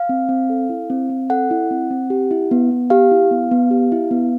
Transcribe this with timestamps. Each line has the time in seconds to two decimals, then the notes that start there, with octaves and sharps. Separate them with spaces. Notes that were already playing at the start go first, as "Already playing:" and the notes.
Already playing: F5
0.09 C4
0.29 C4
0.50 A4
0.70 E4
0.90 C4
1.10 C4
1.30 A4 F#5
1.51 E4
1.71 C4
1.91 C4
2.10 G4
2.31 E4
2.51 B3
2.71 B3
2.90 G4 F5
3.11 E4
3.31 B3
3.51 B3
3.71 G4
3.92 E4
4.11 B3